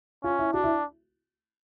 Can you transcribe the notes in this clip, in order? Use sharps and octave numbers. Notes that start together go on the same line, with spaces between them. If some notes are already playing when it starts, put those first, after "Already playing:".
C#4 F4
E4
D4 F#4
E4